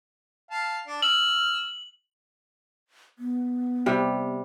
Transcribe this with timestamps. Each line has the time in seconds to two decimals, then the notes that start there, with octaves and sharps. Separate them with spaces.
0.51 F5 A5
0.87 D4
1.02 E6 F6 F#7
3.19 B3
3.86 C3 G3